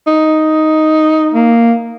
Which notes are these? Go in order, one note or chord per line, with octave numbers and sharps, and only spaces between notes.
D#4
A#3